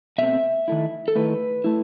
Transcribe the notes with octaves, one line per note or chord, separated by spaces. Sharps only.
B2 A3 C4 E5
D#3 A3 E4
A4
D#3 A3 E4 B4
A3 E4